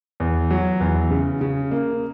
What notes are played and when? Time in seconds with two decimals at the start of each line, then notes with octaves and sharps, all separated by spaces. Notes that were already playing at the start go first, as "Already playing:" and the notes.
0.20 E2
0.51 F#3
0.80 E2
1.11 C#3
1.41 C#3
1.71 A#3